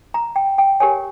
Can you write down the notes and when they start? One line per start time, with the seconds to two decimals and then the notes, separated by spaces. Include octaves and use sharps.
0.14 A#5
0.36 G5
0.58 G5
0.80 G4 A#4 C#5 G#5